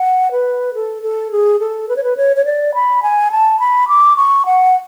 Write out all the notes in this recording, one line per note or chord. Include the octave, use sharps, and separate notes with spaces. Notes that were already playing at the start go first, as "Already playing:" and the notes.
Already playing: F#5
B4
A4
A4
G#4
A4
B4
C#5
B4
C#5
C#5
D5
B5
G#5
A5
B5
D6
C#6
F#5